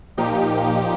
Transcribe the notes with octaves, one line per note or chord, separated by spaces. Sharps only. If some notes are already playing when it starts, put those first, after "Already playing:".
A#2 F3 A#3 D#4 G4